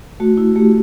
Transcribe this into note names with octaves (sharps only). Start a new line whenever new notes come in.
A3 F#4
E4
A3 G4